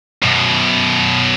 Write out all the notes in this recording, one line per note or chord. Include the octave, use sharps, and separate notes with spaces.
F#2 B2